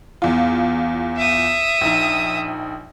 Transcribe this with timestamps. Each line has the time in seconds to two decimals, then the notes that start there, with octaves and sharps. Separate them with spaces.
0.22 E2 F4
1.17 E5 D#6
1.81 A#1 D#4